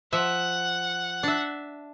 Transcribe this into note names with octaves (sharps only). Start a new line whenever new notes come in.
F3 E5 F#5
D4 E5